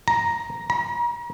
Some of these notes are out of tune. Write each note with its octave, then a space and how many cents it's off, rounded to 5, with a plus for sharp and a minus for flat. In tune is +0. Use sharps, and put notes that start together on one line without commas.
A#5 +5
A#5 +40